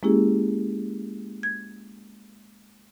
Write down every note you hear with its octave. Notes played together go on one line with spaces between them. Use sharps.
G#3 A#3 C#4 E4 G4 G#4
G#6